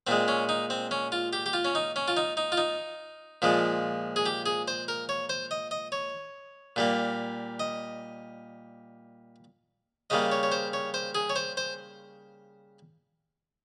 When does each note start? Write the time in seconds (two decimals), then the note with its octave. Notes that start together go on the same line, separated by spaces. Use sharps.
0.07 A#2 G#3 C4
0.28 C#4
0.49 D#4
0.70 C4
0.91 C#4
1.12 F4
1.33 G4
1.46 G4
1.53 F4
1.65 C#4
1.75 D#4
1.96 C#4
2.08 F4
2.17 D#4
2.37 D#4
2.52 F4
2.57 D#4
3.42 A#2 F3 G#3
4.16 G#4
4.26 G4
4.46 G#4
4.68 C5
4.88 A#4
5.09 C#5
5.29 C5
5.51 D#5
5.71 D#5
5.92 C#5
6.76 A#2 G3 A#3
7.60 D#5
10.10 C#3 G3 A#3 D#5
10.32 C#5
10.43 C#5
10.52 C5
10.73 C#5
10.94 C5
11.15 G#4
11.30 C#5
11.36 C5
11.57 C5